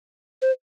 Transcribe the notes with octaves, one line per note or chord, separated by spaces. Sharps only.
C5